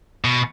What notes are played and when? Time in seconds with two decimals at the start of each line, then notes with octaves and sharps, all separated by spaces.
0.24 B2